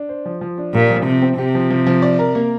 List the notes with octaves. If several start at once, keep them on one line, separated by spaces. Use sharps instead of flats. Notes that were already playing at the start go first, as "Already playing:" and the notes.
Already playing: D4
C5
F3
F3
D4
A#2 G4
F3
C3 F3
C4
C3 G4
F3
F3
F3
D5
A#4
A#3